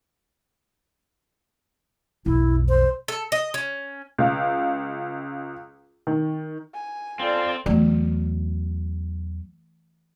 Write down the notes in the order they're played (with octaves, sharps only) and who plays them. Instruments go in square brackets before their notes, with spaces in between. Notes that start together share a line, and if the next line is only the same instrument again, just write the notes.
[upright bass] B1 F2 [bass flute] E4
[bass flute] C5
[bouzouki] A4
D#5
C#4
[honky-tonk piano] C#2 F5
D#3
[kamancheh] G#5
[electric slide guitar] C4 [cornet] F4 [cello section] A4 D5
[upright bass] E2 F#3 [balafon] E3 A3